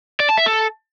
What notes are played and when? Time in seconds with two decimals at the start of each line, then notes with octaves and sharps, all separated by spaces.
0.20 D5
0.29 A5
0.38 E5
0.46 A4